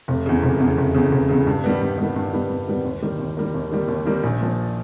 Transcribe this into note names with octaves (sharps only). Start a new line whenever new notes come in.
F1
E2 C#3
F1
E2 C#3
F1
E2 C#3
F1
E2 C#3
G2
D#3 G3 B3
G2
D#3 G3 B3
G2
D#3 G3 B3
G2
D#3 G3 B3
D#2
D#3 G3 A#3
D#2
D#3 G3 A#3
D#2
D#3 G3 A#3
D#2
D#3 G3 A#3
A#1
A#2 F3